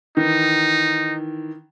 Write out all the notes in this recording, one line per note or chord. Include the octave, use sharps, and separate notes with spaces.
D#3 E3 D#4